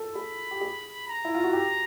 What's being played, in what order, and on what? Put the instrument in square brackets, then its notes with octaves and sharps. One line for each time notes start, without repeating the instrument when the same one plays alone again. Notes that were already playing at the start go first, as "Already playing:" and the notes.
Already playing: [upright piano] A4
[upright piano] G#4 [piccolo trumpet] B5
[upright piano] G4
G#4
[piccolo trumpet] A#5
[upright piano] E4
F4
F#4
[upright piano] G4 [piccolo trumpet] A#5